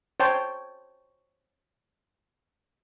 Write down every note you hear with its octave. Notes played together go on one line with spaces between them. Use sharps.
C5 C#5 G5 A5